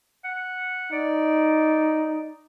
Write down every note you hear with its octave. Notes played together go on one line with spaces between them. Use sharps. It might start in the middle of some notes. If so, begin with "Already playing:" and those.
F#5
D#4 D5